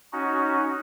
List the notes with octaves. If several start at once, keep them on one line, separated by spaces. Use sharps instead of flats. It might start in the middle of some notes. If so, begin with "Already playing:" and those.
C#4 D#4 F#4